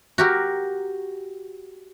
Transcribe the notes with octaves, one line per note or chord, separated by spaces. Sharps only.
F#4 G4 A#4